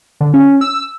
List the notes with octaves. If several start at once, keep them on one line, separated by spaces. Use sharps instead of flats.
D3
C#4
E6